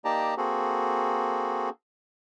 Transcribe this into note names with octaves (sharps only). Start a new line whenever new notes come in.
A#3 D#4 G4 D5 A5 A#5
A#3 C4 F#4 G#4 A4